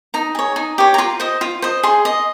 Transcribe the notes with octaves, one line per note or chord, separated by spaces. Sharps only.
D#4 A#5
G#4 C#5
D#4
G4 C#5
A#5
F4 C6
C5 D#5
F4
C5 D#5
G#4 C6
D#5